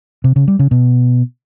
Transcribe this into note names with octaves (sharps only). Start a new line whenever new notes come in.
C3
C#3
G3
C#3
B2